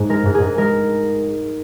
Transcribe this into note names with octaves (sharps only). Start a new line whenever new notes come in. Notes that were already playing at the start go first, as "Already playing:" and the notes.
Already playing: G#2 G#4
G#3 A#4
G#2
G#4
G#2
G#3 A#4